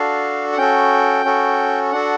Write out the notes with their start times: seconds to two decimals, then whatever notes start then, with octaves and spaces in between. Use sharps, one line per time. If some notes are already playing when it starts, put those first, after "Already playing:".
Already playing: D4 F#4 A4 F5
0.53 F#5
0.58 C#4 F#4 A4 G5
1.25 C#4 F#4 A4
1.92 D4 F#4 A4 F#5